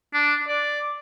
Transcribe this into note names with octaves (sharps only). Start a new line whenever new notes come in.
D4
D5